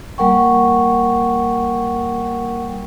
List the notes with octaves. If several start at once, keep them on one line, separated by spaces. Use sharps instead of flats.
G3 A#3 A#4 F#5 G5 C#6